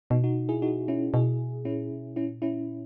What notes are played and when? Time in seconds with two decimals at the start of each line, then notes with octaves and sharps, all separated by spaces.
0.10 B2 B3 D#4
0.24 D#4 F#4
0.49 E4 G#4
0.62 D#4 F#4
0.88 C#4 E4
1.14 B2 E4 G#4
1.65 A#2 C#4 E4
1.91 B2
2.16 A#2 C#4 E4
2.42 C#4 E4